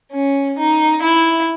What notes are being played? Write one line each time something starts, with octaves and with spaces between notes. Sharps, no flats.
C#4
D#4
E4